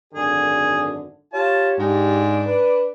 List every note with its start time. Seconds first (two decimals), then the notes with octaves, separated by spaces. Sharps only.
0.13 G#1 F#2 D3 G#4
1.33 F4 G4 C#5 A5
1.79 G#2 D4 G4
2.45 B4